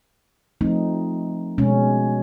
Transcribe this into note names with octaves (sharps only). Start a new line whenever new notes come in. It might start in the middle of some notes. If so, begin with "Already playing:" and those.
F3 A3 C4 D#4
B2 G#3 C#4